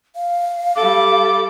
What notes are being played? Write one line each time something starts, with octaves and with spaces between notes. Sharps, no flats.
F5
G3 A4 D6